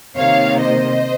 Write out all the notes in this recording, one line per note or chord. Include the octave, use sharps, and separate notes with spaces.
C3 D#3 A#3 C#5 F5
C5 D#5